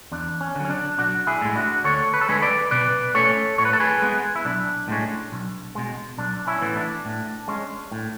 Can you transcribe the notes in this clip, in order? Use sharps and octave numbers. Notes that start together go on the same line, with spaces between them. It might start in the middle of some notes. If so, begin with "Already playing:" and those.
E2 D4
C#4
D3 F#3
C#4
D4
B1 D4 F#4
E4 G#4
A2 G#3
D4 F#4
D2 A4 C#5
B4
A4
D3 G#3 G#4 B4
B4 D5
B2 B4 D5
A3 C#4 A4 C#5
A2 C#5
B4
A4
G#4 B4
G#3 B3
E4
B1 D4
A2 G#3 C#4
B1
B2 G#3
B1 D4
C#4 E4
A2 E3 B3
D4
A2
G#3 C#4
A2